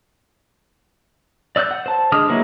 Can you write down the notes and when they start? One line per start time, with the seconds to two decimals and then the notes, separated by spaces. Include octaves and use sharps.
1.56 D5 E6 F#6 G6
1.71 F#5
1.86 C5 A5
2.12 D3 G#3 D#6 F6
2.29 F#3 G#3 A#3 B3 E4